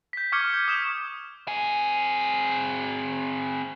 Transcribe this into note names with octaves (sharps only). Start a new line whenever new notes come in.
G6 B6
C#6 D6 F6 G#6 C#7 G7
G6
D#6 F6 E7
C4 G#4